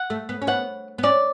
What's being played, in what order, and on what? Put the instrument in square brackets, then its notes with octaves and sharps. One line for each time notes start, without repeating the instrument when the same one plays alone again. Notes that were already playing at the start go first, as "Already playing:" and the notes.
Already playing: [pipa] F#5
[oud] A3
B3
C#4
[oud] B3 [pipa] F#5
[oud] B3
[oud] C#4 [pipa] D5